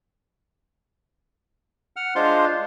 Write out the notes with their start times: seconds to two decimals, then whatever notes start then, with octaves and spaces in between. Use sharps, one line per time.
1.96 F#5 F6
2.15 G#3 D4 F4 C5 F5 C6